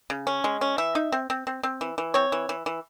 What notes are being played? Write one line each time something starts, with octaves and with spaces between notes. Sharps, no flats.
C#3
C#4
G#3
C#4
E3 E5
D#4
C4
C4
C4
C4
E3
E3
C4 C#5
E3
E3
E3